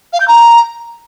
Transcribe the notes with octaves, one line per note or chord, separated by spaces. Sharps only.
F5
G6
A#5